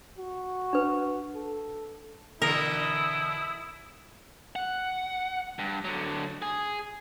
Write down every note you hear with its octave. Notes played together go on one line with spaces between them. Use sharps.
F#4
D4 B4
A4
B2 D3 E3 E4 A#4 D#6
F#5
G2
D3 F#3
G#4